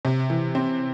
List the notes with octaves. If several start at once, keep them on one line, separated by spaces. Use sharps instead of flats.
C3
E3
C4